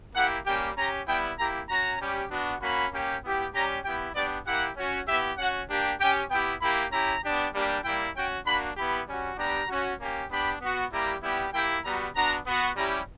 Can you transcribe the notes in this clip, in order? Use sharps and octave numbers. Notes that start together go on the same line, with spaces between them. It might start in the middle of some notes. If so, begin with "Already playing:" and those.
A#3 E4 G4 F#5
G3 A#3 C#4 G4 G5
C#4 G4 A#5
G3 B3 E4 G5
A#3 E4 G4 A#5
C#4 F#4 A#5
G3 C#4 G4
B3 D4 F#4
A#3 C#4 F#4 B5
A#3 C#4 G4
B3 E4 G4
G3 C#4 G4 A#5
B3 E4 G4 G5
B3 D4 G4 D5
A#3 E4 G4 F#5
C#4 F#4
B3 E4 G4 E5
C#4 F#4 F#5
A#3 D4 G4
C#4 G4 G5
B3 E4 G4 G5
A#3 E4 G4 B5
C#4 E4 G4 A#5
B3 D4 G4
G3 A#3 D4 G4
G3 A#3 E4 G5
C#4 F#4 G5
A#3 D4 F#4 B5
B3 E4 G4 B5
G3 C#4 F#4
G3 B3 D4 G4 A#5
C#4 F#4
A#3 C#4 G4
B3 D4 G4 B5
B3 F#4
G3 A#3 E4 G4 A#5
G3 B3 E4 G4
A#3 E4 G4 G5
G3 B3 F#4 A#5
B3 D4 F#4 A#5
B3 F#4
G3 C#4 E4 G4 A#5